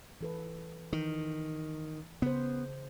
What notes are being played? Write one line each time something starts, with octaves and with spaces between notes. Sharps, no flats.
E3 A4 B4
D#3 E3
C#3 B3 C5